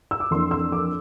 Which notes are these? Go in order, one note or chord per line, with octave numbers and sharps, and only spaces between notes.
E6
D6
F2 E3 A#3 D4 C6
E6
D6